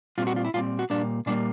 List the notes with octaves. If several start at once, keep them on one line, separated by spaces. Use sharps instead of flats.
A#2 G3 C4 F4
F#4
F4
E4
A#2 G3 C4 F4
F#4
A#2 G3 A#3 D4
A#2 G3 A#3 D4